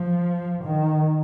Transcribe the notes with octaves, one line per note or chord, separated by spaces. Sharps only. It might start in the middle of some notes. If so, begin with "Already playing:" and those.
Already playing: F3
D#3